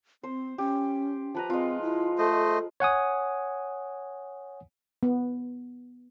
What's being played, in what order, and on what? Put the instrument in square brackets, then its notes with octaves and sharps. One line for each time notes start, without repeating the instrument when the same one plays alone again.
[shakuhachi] C4 [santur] C5
[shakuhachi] C#4 [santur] G4
[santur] F3 B4 A#5
[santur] G#3 F4 [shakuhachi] C4
[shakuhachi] E4
[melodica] A3 C5 D#5 [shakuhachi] A4
[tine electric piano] C#5 F#5 G#5 D#6
[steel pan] B3